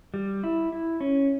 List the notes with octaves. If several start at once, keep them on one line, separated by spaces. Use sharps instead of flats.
G3
E4
E4
C#4